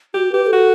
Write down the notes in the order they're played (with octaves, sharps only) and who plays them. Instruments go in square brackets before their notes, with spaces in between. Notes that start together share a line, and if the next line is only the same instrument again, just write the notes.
[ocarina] F#4 [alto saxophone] G4
[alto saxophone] G4 [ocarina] B4
[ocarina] B4
A4
[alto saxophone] F#4